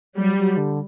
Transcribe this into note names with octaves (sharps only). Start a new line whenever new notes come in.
F#3 G3
F#3
D3